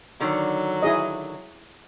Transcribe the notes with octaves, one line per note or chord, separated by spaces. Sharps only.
D3 D#3 F#3
E4 G#4 D#5